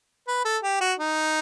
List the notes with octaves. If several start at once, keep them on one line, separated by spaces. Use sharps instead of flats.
B4
A4
G4
F#4
D#4